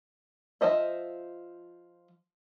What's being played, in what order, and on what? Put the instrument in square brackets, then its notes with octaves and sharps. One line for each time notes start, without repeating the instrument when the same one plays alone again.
[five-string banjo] F3 C5 D#5 E5